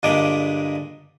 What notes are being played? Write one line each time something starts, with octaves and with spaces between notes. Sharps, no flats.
G2 A#2 D3 G#3 D5